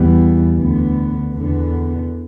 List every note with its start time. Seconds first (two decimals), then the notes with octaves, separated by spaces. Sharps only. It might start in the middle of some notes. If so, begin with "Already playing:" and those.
Already playing: E2 E3 G3 B3
0.56 D2 D3 B3
1.33 E2 D3 B3